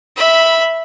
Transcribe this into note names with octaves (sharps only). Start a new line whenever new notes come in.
E5 B5